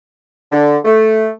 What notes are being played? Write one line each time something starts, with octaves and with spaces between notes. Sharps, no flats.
D3
A3